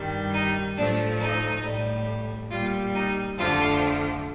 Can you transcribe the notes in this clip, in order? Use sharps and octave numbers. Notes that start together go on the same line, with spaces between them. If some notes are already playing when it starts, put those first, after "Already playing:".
Already playing: G2 D#3 G3
D#4
A2 F3 A3 D4
D#4
A2 G3
A#2 G3 F4
D#4
F2 D3 F3 A3 F4